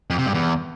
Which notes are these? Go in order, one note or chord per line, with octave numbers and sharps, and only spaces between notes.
F2
C3
G2
E2